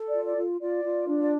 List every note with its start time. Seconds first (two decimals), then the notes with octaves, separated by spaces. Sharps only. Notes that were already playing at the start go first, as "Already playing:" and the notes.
Already playing: A4
0.08 D5
0.14 F4
0.26 D5
0.37 F4
0.61 F4 D5
0.84 F4
1.07 D4
1.19 D5